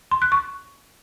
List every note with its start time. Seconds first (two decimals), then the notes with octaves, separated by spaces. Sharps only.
0.11 C6
0.22 F#6
0.32 C#6